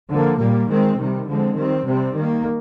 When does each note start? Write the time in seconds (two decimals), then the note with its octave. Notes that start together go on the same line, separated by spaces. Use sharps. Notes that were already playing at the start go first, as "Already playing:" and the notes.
0.10 D3 F3 A#3
0.39 A#2 G3 A#3
0.68 D#3 G#3 C4
0.98 C3 D#3 G3
1.28 D3 F3 G#3 C4
1.57 D#3 G3 C4
1.86 C3 G3 C4
2.15 D#3 A#3